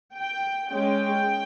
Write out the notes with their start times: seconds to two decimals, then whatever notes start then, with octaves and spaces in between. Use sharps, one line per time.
0.15 G5
0.72 G#3 C#4 G5